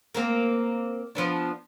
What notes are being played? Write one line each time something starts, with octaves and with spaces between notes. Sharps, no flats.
A#3 C4 A#4
F3 B3 D4